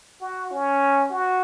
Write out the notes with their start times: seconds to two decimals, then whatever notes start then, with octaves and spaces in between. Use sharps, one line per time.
0.21 F#4
0.51 C#4
1.11 F#4